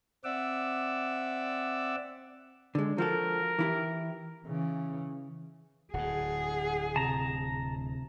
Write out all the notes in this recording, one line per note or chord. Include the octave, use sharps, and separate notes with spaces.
C4 D5 E5 F#5 D6 E6
D3 G#3
F3 F#4 A4 A#4
E3 E4 G4
C#3 E3
D1 A2 G#4 F#5
C3 A5 A#5